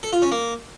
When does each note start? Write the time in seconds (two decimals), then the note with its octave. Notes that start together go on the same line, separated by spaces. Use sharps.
0.03 A4
0.13 F4
0.22 C#4
0.32 A#3